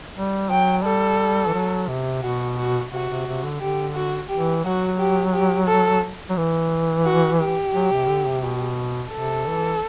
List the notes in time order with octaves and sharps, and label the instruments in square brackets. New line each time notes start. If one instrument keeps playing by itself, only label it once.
[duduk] G3
[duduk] F#3 [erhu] G5
[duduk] G3 [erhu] A4
[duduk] E3
F#3
C3
[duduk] B2 [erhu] F#4
[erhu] F#4
[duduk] C3 [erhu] F#4
[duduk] C3
C3
D3
[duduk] D3 [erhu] G4
[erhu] F#4
[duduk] E3 [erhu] G4
[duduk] F#3 [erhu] F#4
[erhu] G4
G4
A4
[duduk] F#3
E3
[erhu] F#4
G4
[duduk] F#3
C3
D3
C3
B2
[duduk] C3 [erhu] A4
[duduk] E3